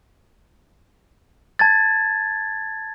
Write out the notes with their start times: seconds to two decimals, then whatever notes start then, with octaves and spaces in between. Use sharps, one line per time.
1.59 A5 G#6 A6